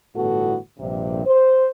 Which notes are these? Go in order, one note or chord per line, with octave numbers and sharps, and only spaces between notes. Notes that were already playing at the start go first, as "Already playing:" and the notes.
G1 A2 E3 B3 F#4 A4
A#1 G2 C3
C5